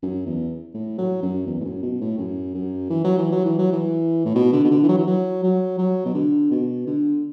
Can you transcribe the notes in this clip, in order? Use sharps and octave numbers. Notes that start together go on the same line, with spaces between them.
F#2
E2
A2
F#3
F#2
E2
A2
F#2
B2
A2
F#2
F#2
E3
F#3
E3
F#3
E3
F#3
E3
A2
B2
D3
B2
D3
E3
F#3
E3
F#3
F#3
F#3
B2
D3
B2
D3